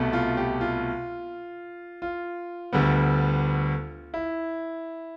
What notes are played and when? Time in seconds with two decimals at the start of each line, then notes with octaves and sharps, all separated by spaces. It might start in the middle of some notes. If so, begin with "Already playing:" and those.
Already playing: C2 B2 A3
0.13 F4
0.37 G4
0.61 F4
2.02 F4
2.73 D2 D3 G3 B3
4.14 E4